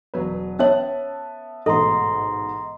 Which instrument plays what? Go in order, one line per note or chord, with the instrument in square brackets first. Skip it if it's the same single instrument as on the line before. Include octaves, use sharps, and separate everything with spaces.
[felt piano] E1 F#3 B4
[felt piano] B3 E5 A5 [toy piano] C#4 C#5
[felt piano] A1 G#2 B2 [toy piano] A4 [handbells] D#5 A#5 C6